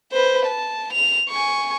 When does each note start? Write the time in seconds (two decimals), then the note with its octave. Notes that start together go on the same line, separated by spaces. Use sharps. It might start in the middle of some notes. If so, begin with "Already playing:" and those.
0.12 B4 C5
0.46 A5
0.93 F7
1.29 G#5 C#6